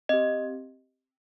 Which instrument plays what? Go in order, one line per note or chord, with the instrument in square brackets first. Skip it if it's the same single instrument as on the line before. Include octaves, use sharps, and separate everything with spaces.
[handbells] C4 G4 D#5